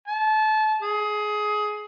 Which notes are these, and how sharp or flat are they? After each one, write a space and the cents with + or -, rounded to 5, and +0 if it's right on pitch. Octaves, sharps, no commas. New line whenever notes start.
A5 -25
G#4 +20